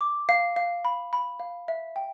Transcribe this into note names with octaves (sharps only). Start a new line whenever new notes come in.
D6
F5
F5
B5
B5
F5
E5
G5